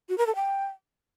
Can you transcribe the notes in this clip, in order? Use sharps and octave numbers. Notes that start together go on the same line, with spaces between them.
F#4
A#4
A4
G5